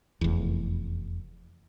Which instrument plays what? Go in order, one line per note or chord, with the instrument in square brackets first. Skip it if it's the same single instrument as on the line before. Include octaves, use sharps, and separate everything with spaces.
[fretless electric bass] F1 E2